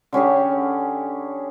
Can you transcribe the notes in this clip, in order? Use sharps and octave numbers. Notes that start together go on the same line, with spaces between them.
D3 C#4 G4 G#4